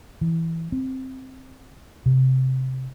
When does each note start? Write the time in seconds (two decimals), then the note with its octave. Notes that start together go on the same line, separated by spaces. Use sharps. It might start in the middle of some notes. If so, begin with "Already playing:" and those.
0.21 E3
0.72 C4
2.06 C3